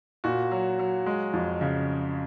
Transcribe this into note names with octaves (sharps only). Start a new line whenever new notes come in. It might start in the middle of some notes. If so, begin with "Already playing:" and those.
A#2 F#4
F#3
F#3
G#3
F2
C#3